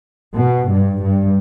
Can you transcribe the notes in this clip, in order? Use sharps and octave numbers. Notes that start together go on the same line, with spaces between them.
B2
G2
G2